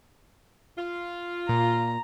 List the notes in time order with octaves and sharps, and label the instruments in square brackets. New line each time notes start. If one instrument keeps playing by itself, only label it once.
[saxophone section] F4
[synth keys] A#2 [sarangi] A#5